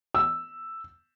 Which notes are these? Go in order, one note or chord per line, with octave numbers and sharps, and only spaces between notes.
E6